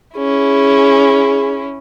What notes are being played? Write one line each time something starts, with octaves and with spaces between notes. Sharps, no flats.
C#4 E4 G#4